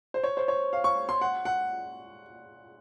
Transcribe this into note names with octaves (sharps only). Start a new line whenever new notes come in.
C5
C#5
C5
C#5
F5
C#6
C6
F#5
F#5